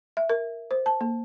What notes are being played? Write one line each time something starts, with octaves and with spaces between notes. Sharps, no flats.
E5
A#4
C5
A5
A#3